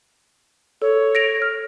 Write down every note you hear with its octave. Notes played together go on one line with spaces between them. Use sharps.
A4 C#5
A#6 D7 F7
F6